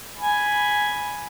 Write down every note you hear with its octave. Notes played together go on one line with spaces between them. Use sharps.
G#5 B5